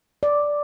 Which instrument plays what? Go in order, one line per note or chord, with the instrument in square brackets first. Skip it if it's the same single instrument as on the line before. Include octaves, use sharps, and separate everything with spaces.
[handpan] D5